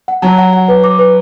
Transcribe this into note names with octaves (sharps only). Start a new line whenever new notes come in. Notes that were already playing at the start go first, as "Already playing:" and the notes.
F#5
F#3 A5
F#5
F#5
B4
D6
B4